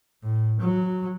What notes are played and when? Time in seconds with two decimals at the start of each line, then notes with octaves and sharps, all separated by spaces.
0.23 A2
0.60 F#3